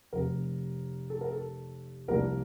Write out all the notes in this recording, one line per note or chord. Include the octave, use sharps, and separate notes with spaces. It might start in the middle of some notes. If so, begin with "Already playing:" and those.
F1 F2 C3 A#4
A4
A#4
A4
C2 C3 F3 A#3 D4 A#4